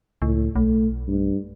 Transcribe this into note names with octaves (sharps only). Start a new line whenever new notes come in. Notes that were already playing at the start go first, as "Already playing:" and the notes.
C#2 A2
B1 A3
G2